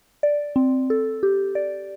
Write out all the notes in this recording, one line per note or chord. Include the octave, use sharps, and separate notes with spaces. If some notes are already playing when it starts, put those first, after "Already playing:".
D5
C4
A4
G4
D5